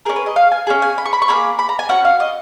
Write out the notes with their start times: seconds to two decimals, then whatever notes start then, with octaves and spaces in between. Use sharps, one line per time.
0.05 C#4 G#4 A#4
0.16 B4
0.26 D#5
0.36 F5
0.52 G#5
0.67 C#4 F4 G#4
0.82 G#5
0.98 B5
1.06 C#6
1.13 B5
1.22 C#6
1.28 A#3 C#4 G#4 B5
1.59 B5
1.69 A#5
1.79 G#5
1.89 C#4 F#4 F#5
2.05 F5
2.20 D#5